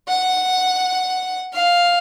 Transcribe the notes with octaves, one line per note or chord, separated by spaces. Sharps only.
F#5
F5